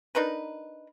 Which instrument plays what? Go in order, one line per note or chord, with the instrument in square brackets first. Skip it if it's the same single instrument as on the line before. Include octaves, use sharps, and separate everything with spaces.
[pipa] D4 D#4 A#4 B4